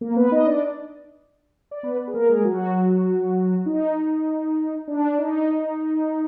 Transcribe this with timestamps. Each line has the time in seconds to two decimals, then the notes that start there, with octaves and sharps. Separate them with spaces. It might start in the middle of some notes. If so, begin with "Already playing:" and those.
0.01 A#3 A#4
0.16 B3 B4
0.31 D#4 D#5
0.47 D4 D5
1.71 D5
1.83 B3 B4
2.07 G#4
2.14 A#3 A#4
2.29 G#3 G#4
2.44 F#3 F#4
3.66 D#4
4.88 D4
5.19 D#4